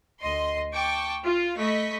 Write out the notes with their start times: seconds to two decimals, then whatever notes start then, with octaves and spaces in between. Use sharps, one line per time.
0.20 D2 D#5 C6
0.73 G5 A5 C#6 D6
1.23 F4 F5
1.57 A3 D#5 B5 C#6 B6